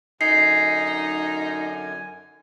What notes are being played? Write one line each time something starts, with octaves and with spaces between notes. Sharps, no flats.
F#2 D3 D#4 G#5 C7